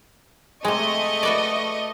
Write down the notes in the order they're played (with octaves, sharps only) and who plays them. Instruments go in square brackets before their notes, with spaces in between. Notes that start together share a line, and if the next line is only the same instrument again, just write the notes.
[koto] C3 G#3 [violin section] A3 D#5 C#6
[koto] F#4 B4 D5